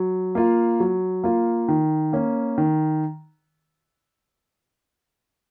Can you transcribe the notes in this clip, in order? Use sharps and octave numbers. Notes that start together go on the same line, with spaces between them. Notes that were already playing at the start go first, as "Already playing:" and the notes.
Already playing: F#3
A#3 F4
F#3
A#3 F4
D#3
A#3 C#4
D#3